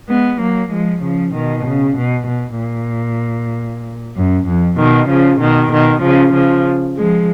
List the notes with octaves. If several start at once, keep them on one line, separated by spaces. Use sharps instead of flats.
G#3 B3
F#3 A#3
F3 G#3
C#3 F3
B2 D#3
C#3
B2
B2
A#2
F#2
F2
B2 D#3
C#3 F3
B2 D#3
B2 D#3
C#3 F3
C#3 F3
F3 G#3